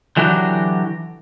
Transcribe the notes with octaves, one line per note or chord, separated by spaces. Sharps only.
D3 E3 F#3 F#4 G4